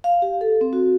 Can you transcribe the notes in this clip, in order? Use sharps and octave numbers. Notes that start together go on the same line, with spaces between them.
F5
G4
A4
C4
F#4